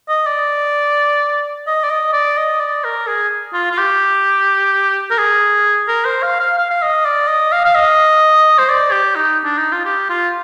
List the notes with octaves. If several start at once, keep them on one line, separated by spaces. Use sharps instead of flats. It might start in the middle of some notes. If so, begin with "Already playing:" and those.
D#5
D5
D#5
D5
D#5
D5
D#5
D5
A#4
G#4
F4
F4
G4
A#4
G#4
A#4
C5
F5
F5
F5
F5
D#5
D5
D#5
F5
F5
D#5
C5
D5
G4
D#4
D4
D#4
F4
G4
F4